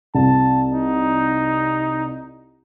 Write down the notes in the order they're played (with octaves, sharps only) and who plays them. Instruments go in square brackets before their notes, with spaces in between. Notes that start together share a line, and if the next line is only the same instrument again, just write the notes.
[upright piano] C2 [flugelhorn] A5
[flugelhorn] D#4